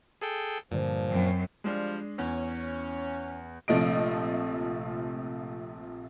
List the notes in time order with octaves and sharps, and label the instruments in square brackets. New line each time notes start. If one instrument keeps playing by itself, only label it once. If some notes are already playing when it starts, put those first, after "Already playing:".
[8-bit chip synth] G#4 A4 G5
[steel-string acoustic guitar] G2 D3 C5 [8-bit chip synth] A#2 [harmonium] F3
[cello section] F#2 [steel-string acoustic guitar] C4 A#4 G5
[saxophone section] F3 G3 [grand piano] G#3 D4
[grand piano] E2 [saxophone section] C#4
[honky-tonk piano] A#1 C3 F3 A3 D#5 D7